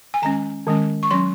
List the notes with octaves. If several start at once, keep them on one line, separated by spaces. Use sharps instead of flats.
G#5
D#3 G#3 C#4 A#5
D#3 G#3 C#4
C#6
F#3 C#4 C6